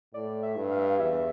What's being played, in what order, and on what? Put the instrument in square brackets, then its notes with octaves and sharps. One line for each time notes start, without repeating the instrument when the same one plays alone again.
[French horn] A2 [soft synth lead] D5
[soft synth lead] E5
[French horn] G2
[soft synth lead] F5
E5
F5
[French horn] E2 [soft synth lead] E5